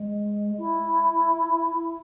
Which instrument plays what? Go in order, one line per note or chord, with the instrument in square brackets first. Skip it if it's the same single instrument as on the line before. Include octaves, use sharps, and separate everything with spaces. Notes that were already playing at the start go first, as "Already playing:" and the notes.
Already playing: [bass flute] G#3
E4